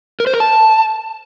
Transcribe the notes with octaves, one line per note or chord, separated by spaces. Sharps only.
A#4
C5
A#4
A5